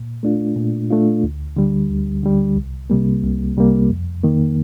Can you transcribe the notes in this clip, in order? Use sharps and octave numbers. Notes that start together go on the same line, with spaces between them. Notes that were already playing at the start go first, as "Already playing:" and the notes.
Already playing: A#2
A3 D4 F4
A#2
A3 D4 F4
D2
D3 G3
D2
D3 G3
C2
C3 G3 A#3
C2
C3 G3 A#3
F2
D#3 A#3